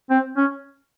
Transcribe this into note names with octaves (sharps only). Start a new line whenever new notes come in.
C4
C#4